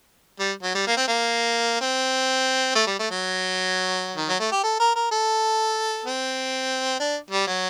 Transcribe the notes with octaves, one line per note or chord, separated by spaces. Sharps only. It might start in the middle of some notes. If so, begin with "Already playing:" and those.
G3
F#3
G3
A#3
C4
A#3
C4
A3
G3
A3
F#3
D#3
F#3
A3
G4
A4
A#4
A#4
A4
C4
D4
G3
F#3